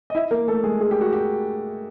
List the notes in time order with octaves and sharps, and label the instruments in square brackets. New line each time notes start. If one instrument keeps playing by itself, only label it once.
[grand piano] D#5
E4 E5
A#3 A#4
A3 A4
G#3 G#4
G#4
G4
F#4
G4